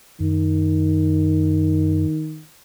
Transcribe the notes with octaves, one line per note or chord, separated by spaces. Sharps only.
F#2 D#3